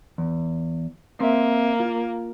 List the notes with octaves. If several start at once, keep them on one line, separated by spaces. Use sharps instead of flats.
E2
A#3 C4 E5
F4